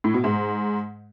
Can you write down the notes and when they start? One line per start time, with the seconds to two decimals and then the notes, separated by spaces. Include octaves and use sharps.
0.04 A2
0.14 B2
0.24 G#2